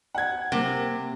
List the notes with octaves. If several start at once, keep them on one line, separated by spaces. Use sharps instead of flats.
F#5 G#6
C3 A#3 C4